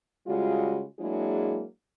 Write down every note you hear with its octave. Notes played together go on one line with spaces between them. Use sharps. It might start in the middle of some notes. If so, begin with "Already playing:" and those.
C#3 G3 G#3 F4 F#4
F#3 G#3 A#3 D4 E4 G#4